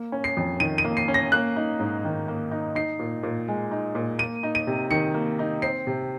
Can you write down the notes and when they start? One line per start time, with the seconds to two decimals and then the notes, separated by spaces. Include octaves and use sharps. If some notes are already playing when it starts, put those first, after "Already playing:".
Already playing: A#3
0.12 C#4
0.24 C7
0.37 F2
0.60 D#3 D#7
0.78 D#7
0.85 A#3
0.97 C7
1.08 C#4
1.14 A#6
1.32 A#3 F#6
1.56 D#4
1.79 G#2
2.04 D#3
2.28 A#3
2.51 D#4
2.75 D#4 C7
2.99 A#2
3.23 A#2
3.48 G#3
3.71 D#4
3.95 A#2
4.19 A#3 D#7
4.43 D#4
4.55 D#7
4.67 C3
4.91 D#3 C#7
5.14 A#3
5.39 D#4
5.62 C4 C7
5.87 C3